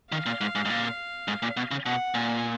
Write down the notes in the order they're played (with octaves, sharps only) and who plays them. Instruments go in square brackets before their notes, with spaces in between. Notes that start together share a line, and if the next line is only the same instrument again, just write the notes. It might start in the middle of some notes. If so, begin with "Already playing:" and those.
[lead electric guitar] D#3 [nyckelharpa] F5
[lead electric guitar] A#2
G#2
G#2
G#2
A#2
G#2
A#2
B2
C#3
[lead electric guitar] B2 [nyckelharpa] F#5
[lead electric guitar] A#2 [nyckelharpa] G#5